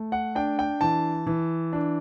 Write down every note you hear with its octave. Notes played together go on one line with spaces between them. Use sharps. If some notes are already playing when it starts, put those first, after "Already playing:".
Already playing: A3
F#5
D4 G5
G5
E3 A5
E3
D4